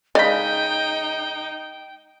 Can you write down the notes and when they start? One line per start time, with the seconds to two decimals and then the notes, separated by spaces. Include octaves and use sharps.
0.15 C#3 G#3 D#4 D5 D#5 G5 B5